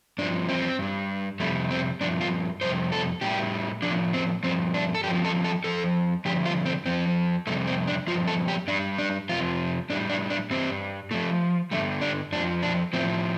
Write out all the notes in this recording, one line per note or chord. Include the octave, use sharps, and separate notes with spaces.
G2 F3 D4
C4
G2 G3
F2 C3 G3 A3
C4
G2 F3 D4
F4
F2 C3 G3 C5
A4
A2 G3 G4
A2 F3 D4
C4
G2 F3 C4
D4
A4
G2 F3 G4
A4
A4
F2 F3 A4
G2 D3 F3 G4
F4
C4
F2 D3 F3 C4
F2 C3 G3 A3
C4
D4
G2 F3 F4
A4
G4
G2 G3 D4
D4
F2 C3 F3 F4
A2 G3 D4
D4
D4
G2 G3 C4
A2 F3 A3
G2 D3 G3 A3
D4
F2 F3 D4
D4
A2 F3 C4